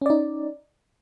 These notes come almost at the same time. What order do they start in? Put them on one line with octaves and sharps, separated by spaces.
C#4 D5 D#4